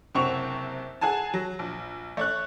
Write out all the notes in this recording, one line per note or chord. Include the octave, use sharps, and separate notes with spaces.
F#1 C3 C4 F#5 C#6 F7
G#4 F#5 G#5 A5
F#3
A#1
A3 C#5 F#6